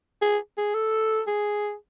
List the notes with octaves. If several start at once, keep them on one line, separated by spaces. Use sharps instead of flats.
G#4
G#4
A4
G#4